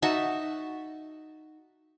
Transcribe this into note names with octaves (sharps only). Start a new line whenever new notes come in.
D#4 F#4 E5 A5